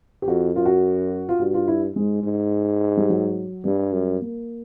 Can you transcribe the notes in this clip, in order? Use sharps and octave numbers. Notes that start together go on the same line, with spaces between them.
G4
F2 F#4
F#2 F4
F#4
F4
G2 F#4
F4
E4
G#2 G#3
G#2
G3
F#3
G2 G3
F#2
A#3